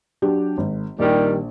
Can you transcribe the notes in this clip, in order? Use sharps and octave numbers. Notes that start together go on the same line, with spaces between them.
F#3 D4 G4
G#1
A#1 D#3 G3